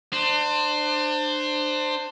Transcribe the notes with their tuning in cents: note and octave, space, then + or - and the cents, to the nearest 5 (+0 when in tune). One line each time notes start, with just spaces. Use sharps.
D4 +30 C5 +0